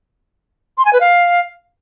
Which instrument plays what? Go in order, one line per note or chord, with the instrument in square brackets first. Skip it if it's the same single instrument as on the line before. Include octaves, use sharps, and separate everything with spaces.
[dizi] C6
G#5
B4
F5